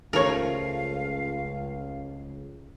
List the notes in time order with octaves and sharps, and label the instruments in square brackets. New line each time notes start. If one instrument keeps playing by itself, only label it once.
[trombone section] C#2 [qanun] F3 A3 [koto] A#4 C#5 [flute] F5